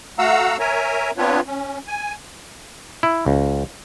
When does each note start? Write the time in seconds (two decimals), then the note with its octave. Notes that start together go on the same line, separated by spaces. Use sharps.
0.19 A3 F#4 F5 F#5 A#5 E6
0.60 A#4 C#5 E5 G#5 A#5
1.18 B3 C4 D4 F4 B4 C#5
1.46 C#4
1.87 G#5
3.03 E4
3.26 C#2